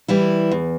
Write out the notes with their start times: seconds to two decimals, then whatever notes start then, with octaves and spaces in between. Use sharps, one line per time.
0.08 E3 G3 E4
0.51 E2